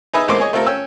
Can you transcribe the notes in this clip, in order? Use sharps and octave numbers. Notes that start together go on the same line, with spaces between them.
D#4 G#4 B4 D#5 E5
A1 G#3 A#3 C4 C6 D6
G#4 C#5 D#5
A3 C4 F4 A4 A#4
C#4 G5 E6